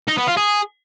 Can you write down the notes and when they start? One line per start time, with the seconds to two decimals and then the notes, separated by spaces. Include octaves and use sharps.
0.08 D#4
0.18 B3
0.28 F4
0.37 G#4